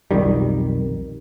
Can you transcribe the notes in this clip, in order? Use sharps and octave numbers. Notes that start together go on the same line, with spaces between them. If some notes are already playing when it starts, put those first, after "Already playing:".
B1 F2 D#3 G3